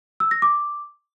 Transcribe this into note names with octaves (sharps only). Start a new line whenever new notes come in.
E6
A#6
D6